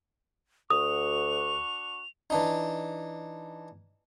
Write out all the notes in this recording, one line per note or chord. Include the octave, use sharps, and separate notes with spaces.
D2 D4 F#4 C#6 D#6 F7
E3 D4 D#4